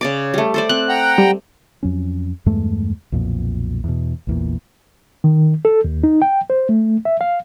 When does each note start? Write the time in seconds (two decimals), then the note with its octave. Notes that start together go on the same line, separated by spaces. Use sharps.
0.01 C#3 D5 D6
0.34 G3 A3
0.54 A4 C5 D5
0.69 C4 F#6
0.89 F#5 G5 A#5
1.18 G3
1.83 F2 F#3 C#4
2.46 E2 G2 G#3 A3
3.12 B1 F2 A#2
3.84 E2 B2
4.27 A#1 E2 A#2
5.24 D#3
5.65 A4
5.85 D#2
6.04 D#4
6.22 G5
6.50 C5
6.69 A3
7.05 E5
7.21 F5